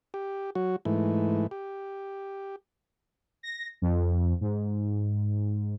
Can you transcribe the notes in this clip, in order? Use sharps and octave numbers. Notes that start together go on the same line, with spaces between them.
G4
F#3 F#4
G#2 E3 A3
G4
A#6
F2
G#2